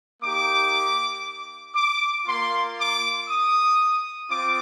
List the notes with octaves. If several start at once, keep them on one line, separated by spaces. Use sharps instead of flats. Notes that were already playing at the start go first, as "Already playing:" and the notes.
A#3 D#4 G4 D6
D6
A#3 F4 C6
D6
D#6
C4 F4 D6